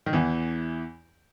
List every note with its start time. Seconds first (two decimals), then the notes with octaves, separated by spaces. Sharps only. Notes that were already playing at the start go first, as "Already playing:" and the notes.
0.06 D#3
0.13 E2 E3